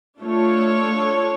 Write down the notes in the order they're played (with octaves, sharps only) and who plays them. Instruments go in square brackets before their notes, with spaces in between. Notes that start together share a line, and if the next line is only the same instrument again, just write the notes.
[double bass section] A3 [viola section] D4 F4 A4 C#5